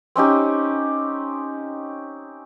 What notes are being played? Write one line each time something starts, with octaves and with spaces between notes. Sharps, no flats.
C4 C#4 D#4 G4